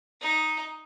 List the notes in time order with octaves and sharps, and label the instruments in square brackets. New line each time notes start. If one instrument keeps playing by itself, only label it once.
[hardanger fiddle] D#4